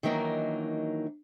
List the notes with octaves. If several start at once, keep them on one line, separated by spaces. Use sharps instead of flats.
D#3 E3 F#3 A#3 D4 D#4